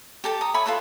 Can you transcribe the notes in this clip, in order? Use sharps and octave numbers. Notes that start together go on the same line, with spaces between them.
G4 A4 A5
A#5 D#6
C#5 E5 G#5 B5
F4 A4 B4 C#5